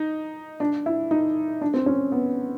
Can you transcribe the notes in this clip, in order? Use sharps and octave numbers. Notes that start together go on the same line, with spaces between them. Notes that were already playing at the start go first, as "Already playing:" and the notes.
Already playing: D#4
D4
E4
D#4
D4
C4
C#4
B3